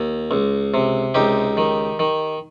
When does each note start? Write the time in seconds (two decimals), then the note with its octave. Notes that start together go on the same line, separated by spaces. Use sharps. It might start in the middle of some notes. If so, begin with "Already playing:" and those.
Already playing: D#2
0.31 C#2
0.74 C3
1.15 C#2 D#4 G4
1.57 D#3
1.99 D#3